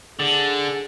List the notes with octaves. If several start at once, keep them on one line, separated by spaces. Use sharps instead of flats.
D3 G#4